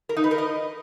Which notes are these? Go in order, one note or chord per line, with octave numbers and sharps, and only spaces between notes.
A#4
D#4
B4
A#4
D#5